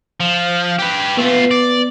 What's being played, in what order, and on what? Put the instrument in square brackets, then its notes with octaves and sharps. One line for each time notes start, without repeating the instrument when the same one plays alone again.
[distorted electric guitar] F3
G4 B4
[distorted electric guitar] A3 F4 [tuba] B3
[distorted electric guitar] D5